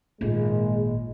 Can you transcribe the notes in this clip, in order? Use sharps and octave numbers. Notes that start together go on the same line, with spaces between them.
G#1 A#2 G#3